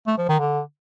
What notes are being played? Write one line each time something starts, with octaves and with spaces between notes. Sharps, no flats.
A3
F3
D#3
D3